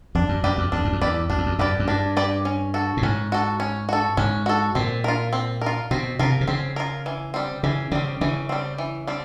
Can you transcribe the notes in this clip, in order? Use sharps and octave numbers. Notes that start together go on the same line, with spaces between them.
F2 D4
F#2
F#2 G4 B4 D5
F2
E2 D4
F#2
F2
E2 G4 B4 D5
F2 D4
E2
F2
F#2 G4 B4 D5
F#2
G2 D4
G4 B4 D5
C#4
F#4 A4
A2
G#2 C#4
F#4 A4
C#4
F#4 A4
G#2 C#4
F#4 A4
A#2 C4
F4 A#4
C4
F4 A#4
B2 C4
C3 F4 A#4
C3
C#3 C4
F4 A#4
E3
G3 C4
C#3 E3
C#3 G3 C4
C#3 E3
G3 C4
E3
G3 C4